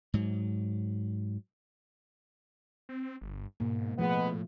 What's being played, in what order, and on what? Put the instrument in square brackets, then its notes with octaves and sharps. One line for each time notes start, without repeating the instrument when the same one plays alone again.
[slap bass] G#2 F#3
[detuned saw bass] C4
G1
[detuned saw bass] G#2 [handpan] B2 A#3
[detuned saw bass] A2 [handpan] F3 A3 F4 [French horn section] G#3 B3